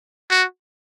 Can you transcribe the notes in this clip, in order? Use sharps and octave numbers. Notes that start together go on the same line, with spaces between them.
F#4